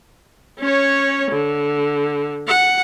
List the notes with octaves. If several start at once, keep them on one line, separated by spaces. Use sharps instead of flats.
C#4 C#5
D3
F#5